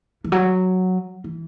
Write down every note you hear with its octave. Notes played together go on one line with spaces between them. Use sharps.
E3
F#3
E3